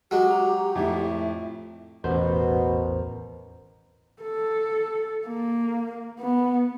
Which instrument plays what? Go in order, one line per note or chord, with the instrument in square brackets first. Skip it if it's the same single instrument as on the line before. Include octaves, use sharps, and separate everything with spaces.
[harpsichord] F#3 G#3 [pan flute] F#4 [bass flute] G4
[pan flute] A#5
[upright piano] F2 A2 [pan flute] E5
[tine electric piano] A1 C5 [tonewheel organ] E2 A#4 [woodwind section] B2
[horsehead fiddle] A4
A#3
B3